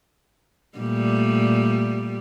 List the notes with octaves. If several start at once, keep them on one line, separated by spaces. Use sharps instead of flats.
A#2 G3 A3